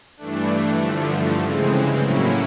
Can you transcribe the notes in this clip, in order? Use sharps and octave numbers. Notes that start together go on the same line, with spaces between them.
G2 E3 A3 D4
G2 D3 F3 A3
C#3 E3 G#3 C4
A2 F#3 A#3 C#4 E4